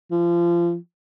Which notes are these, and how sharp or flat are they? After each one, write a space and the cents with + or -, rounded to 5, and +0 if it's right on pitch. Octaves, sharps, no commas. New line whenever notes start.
F3 -25